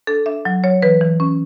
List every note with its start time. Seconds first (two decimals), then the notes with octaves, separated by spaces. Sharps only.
0.07 D4 A4
0.26 D4 E5
0.45 F#3
0.64 F#3 C#5
0.82 E3 B4
1.01 E3
1.20 C#4